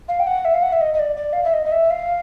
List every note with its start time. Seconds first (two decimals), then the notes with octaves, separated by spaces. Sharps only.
0.08 F5
0.20 G5
0.27 F#5
0.45 E5
0.54 F5
0.62 F#5
0.72 E5
0.81 D#5
0.94 D#5
0.99 D5
1.17 D5
1.33 F5
1.44 E5
1.53 D#5
1.65 D#5
1.72 E5
1.90 F5